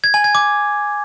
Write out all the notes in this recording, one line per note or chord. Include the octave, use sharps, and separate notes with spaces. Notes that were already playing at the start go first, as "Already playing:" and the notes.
G#6
G#5
G#6
D6